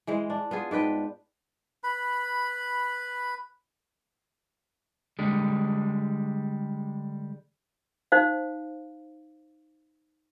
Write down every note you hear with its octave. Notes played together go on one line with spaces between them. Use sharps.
E3 G#3 C5
D4
B3 F4 G#4
G#2 D4 B4 G5
B4 B5
D3 G3 G#3
D#4 C5 F5